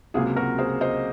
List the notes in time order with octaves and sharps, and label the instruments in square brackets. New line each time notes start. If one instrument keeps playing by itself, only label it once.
[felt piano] C#2 C3 F#3 A#3 F4 G#4
F#4 A#4
G#4 C5
C5 D#5